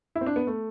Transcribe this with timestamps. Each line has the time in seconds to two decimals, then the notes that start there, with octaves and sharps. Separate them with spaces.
0.16 E4
0.21 C4
0.26 D4
0.36 B3
0.47 A3